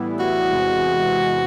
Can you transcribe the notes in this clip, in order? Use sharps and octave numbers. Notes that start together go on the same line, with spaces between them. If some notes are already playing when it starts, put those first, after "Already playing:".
Already playing: A2 E3 G3 B3 E4
F#4
E2 C3 E3 G#3